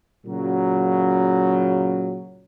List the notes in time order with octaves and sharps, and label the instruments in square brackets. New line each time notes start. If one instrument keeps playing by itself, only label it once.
[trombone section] A#2 C#3 F#3